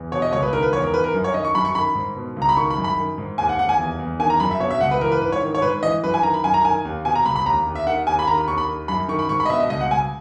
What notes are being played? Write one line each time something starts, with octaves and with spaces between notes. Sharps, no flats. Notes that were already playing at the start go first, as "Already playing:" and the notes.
Already playing: E2
B2 C#5
D#5
C#2 C#5
B4
D#3 A#4
B4
E2 C#5
A#4
D#3 B4
A#4
F#2
C#5
D#3 D#5
C#6
F#2 B5
C#6
D#3 B5
G#2
B2
C#2
A#5
B5
D#3 C#6
B5
F#2
B5
D#3
G#2
D#2 G#5
F#5
D#2 F#5
G#5
E2
E2
D#3 G#5
A#5
F#2 B5
E5
B2 C#5
E5
C#2 F#5
B4
E3 A#4
B4
G#2 B4
C#5
D#3
C#5
G#2 B4
E3 D#5
F#2 B4
G#5
D#3 A#5
B5
F#2 G#5
A#5
D#3 G#5
D#2
B2 G#5
A#5
C#2 B5
B5
D#2 A#5
D#2
E5
D#3 F#5
D#2 G#5
B5
D#3 A#5
B5
D#2 C#6
B5
D#3
F#2 B5
D#3 C#6
B5
G#2 C#6
B5
D#5
B2 E5
D#5
C#2 D#5
F#5
C#2 G#5